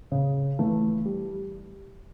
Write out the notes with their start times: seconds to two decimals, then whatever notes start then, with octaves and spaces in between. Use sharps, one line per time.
0.12 C#3
0.59 E3 A3
1.06 G3